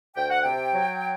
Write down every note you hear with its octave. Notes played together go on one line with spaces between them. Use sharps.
D2 G5
F#5
C3 G5
F#3